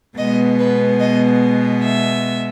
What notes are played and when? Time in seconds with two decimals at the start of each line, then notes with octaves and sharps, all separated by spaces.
0.17 B2 G#3 B3 D#5
0.59 B4
1.00 D#5
1.83 E5